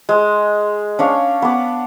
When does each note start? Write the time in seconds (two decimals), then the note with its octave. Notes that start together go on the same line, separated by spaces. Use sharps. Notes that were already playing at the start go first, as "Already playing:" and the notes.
0.09 G#3
0.99 C#4 D4 F5
1.42 B3 D6